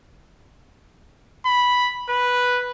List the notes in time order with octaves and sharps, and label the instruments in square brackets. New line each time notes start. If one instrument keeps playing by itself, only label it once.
[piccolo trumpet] B5
B4